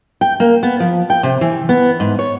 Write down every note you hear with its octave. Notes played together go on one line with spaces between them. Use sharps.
G5
A#3
B3
F3
G5
C3
E3
B3
G#2
C#5